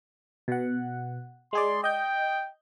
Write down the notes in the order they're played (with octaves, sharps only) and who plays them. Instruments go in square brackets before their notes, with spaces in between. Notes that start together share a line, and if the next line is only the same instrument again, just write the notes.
[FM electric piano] B2 F#5
[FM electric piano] G#3 G#4 D5 [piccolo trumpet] C6
[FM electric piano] D#5 G6 [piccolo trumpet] G5